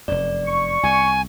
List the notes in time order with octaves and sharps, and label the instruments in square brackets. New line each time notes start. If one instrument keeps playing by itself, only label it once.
[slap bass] F1 F#2 [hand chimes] D5
[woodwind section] C#6
[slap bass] C2 [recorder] G#5